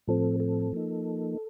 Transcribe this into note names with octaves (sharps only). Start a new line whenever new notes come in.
A2 F3 C4 A4
A4
F3 A#3 D#4